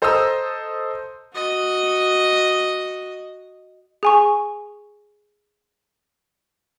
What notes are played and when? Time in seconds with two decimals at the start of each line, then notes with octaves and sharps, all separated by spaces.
0.02 A4 C5 D#5 A#5 D#6 E6
1.34 F#4 D#5
4.03 G#4 G#5 C#6